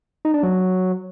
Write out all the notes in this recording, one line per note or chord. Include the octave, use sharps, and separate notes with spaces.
D#4
D4
F#3